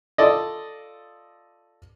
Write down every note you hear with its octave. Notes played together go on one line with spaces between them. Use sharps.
F4 A4 D5 D#5